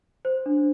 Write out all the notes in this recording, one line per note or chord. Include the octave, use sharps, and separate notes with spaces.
C5
D4